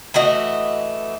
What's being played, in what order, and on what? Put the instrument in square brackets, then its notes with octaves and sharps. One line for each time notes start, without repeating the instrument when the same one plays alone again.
[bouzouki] E3 A3 F#4 D#5